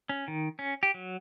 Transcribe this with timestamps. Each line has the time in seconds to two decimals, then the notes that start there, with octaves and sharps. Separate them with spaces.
0.09 C#4
0.28 D#3
0.59 C#4
0.83 G4
0.94 F#3